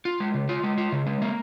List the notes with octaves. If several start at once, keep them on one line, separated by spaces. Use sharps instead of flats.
F4
G#3
C#3
F4
G#3
F4
C#3
G#3
A#3